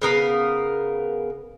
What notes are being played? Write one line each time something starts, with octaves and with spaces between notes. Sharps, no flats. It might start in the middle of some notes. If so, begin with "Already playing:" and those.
C#3 B3 A#4 F5